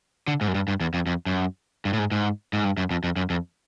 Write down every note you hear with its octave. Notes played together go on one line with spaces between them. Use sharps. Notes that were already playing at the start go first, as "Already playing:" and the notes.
D3
G#2
F#2
G2
G2
E2
F2
F2
F#2
G2
A2
G#2
G#2
G#2
G2
F#2
F2
F2
F#2
F2